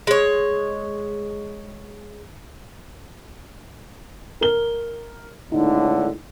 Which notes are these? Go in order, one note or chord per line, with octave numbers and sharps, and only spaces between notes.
G#3 C#5
A#4 G7
C#2 A2 D3 D#4